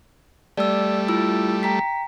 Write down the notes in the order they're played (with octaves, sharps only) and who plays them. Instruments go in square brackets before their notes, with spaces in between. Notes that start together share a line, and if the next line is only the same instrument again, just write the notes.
[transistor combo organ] G3 A3 [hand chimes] D5 E6
[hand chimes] E4 F4 E6
G5 A#5 B6